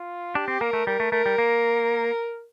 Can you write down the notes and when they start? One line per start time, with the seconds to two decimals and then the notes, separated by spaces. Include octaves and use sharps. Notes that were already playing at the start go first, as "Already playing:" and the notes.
Already playing: F4
0.35 D4 G4
0.48 C4
0.61 A#3 A#4
0.73 A3
0.87 G3 A#4
1.00 A3
1.12 A3 A#4
1.26 G3
1.38 A#3